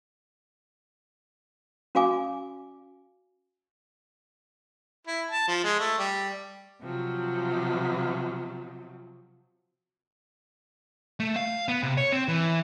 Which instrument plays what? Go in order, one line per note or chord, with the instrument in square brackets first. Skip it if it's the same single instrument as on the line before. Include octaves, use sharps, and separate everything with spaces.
[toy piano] C#4 F#4 D5 F5 G#5 D6
[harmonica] E4
A5
F3
G#3
A3
G3
[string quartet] C3 F3 F#3
[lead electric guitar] A3
F5
B3
C3
C#5
C4
E3